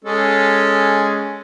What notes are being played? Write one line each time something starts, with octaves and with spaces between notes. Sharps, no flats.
G#3 C#4 A4